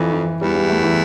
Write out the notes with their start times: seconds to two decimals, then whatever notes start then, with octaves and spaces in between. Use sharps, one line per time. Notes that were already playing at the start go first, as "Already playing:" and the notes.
Already playing: F2 E3
0.13 E3
0.41 E2 G3
0.55 G3
0.69 A3
0.84 E3